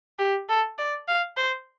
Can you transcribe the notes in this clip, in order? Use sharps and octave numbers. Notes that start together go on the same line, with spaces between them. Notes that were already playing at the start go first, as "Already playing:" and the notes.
G4
A4
D5
F5
C5